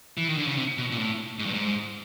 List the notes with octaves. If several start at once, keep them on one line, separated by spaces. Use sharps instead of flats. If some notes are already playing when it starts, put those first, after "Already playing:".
E3
D#3
D3
C#3
C3
B2
A#2
A2
G#2
G2
G#2